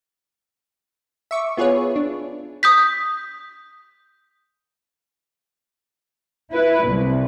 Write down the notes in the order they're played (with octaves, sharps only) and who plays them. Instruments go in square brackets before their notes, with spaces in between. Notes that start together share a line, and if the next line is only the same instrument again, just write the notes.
[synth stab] E5 C#6 D6
B3 F4 G#4 B4 C#5
D4
[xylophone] D#6 G6 B6
[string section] E4 B4
C2